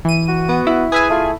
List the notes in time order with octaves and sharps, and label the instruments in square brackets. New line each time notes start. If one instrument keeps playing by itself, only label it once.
[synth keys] E3 D#7
[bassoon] F#4
[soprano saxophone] B3
[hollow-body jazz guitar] E4
[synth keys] G#4 E5 G#5 [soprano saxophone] B4
[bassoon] A3 [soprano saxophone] F4